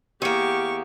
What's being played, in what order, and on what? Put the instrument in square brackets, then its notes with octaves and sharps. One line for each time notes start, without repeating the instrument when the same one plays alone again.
[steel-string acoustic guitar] E2 A#3 [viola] G4 [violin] C#6